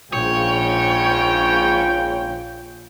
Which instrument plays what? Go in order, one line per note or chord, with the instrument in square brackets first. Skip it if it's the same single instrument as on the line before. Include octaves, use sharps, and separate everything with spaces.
[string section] A#1 [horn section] G#2 C#3 G5 [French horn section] F4 [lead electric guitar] C#5